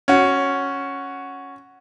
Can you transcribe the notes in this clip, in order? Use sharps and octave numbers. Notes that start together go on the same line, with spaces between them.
C#4 F#4